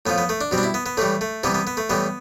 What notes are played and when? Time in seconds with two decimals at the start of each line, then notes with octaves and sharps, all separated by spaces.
0.06 A2 F3 B3
0.18 B3
0.29 A3
0.41 D4
0.51 B2 G3 C4
0.58 D4
0.63 E4
0.74 B3
0.86 B3
0.97 A2 E3 G3 A3
1.21 A3
1.43 C3 E3 G3 B3
1.54 B3
1.67 B3
1.77 A3
1.90 A2 E3 G3 B3